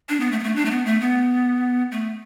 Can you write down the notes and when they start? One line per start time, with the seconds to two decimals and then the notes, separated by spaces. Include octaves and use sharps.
0.09 D4
0.20 B3
0.32 A3
0.39 B3
0.44 A3
0.56 D4
0.65 A3
0.71 B3
0.86 A3
1.01 B3
1.92 A3